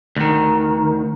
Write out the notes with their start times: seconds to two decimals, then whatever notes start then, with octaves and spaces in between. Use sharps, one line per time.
0.16 D2 D#3